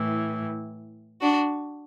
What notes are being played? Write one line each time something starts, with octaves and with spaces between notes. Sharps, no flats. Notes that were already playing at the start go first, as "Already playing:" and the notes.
Already playing: A2 E3
D4 F#4